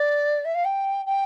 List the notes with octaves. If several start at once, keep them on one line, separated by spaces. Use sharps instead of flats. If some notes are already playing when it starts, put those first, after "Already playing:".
Already playing: D5
E5
F5
G5
G5